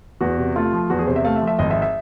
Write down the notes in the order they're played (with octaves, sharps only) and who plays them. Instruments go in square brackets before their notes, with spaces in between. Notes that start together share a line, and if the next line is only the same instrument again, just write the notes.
[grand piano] E2 F#4
C3
A3 F4
F3
E2 F#4
G#4
C3 C5
E5
A3 F5
E5
F3
E5
G#1 D#5
E5
E5